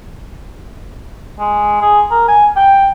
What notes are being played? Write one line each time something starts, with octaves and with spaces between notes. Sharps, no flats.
G#3
G#4
A#4
G#5
G5